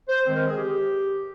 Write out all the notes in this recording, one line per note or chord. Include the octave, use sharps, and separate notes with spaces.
C5
D#3 G#3 C4 C5
A#4
G#4
G4